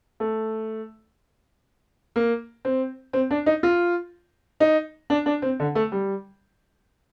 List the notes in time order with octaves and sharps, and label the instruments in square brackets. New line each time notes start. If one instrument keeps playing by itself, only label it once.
[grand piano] A3
A#3
C4
C4
D4
D#4
F4
D#4
D4
D4
C4
D3
A3
G3